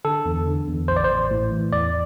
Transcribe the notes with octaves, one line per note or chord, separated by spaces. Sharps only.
D3 A4
E2
D3
E2
A1 C5
D5
C5
A1
A2
E3
E2 D5